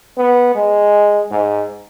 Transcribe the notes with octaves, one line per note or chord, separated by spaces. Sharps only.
B3
G#3
G#2